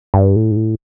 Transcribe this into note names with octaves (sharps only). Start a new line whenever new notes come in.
G2
A2
G#2
A2